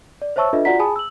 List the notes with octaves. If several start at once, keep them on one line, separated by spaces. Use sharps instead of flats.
D5
C5 C#5 E5 A5 C#6 E6
D4 F4 A4 B4 D#5 E5
F4 F#4 D5 F#5 A#5 B6
G#4 G#5 A5 B5 D#6
E6 F#7